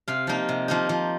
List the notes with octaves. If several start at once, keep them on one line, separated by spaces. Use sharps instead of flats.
C3 F5
F3 A#3 D#4
C3
F3 A#3 D#4
F3